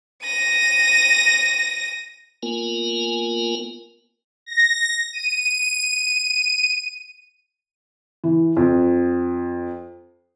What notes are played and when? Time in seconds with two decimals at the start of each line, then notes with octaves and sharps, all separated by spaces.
0.23 A#6 D#7
2.43 A#3 B3 F4 A#4 G#5
4.46 A#6
5.13 D#7
8.24 E3
8.57 F2